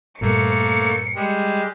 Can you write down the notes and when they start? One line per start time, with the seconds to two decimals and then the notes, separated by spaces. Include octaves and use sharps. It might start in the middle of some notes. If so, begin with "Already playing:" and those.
0.21 G2 A#2 A3 A#3 C#7
1.15 G3 G#3